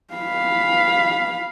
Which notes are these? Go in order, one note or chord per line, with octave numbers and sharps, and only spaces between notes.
F5 B5